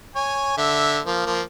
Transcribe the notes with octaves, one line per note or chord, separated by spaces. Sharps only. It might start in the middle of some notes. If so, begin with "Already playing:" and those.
C#5 G#5
D3 E5
F3 A#3
F3 A#3